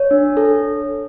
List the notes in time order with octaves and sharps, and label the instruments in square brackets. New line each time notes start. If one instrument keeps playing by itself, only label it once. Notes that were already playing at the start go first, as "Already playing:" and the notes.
Already playing: [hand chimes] C#5
D4
A4